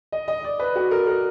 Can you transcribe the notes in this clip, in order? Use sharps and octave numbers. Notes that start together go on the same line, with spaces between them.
D#5
D#5
D5
B4
F#4
A#4
A#4